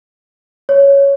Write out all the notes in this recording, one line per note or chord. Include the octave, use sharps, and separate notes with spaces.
C#5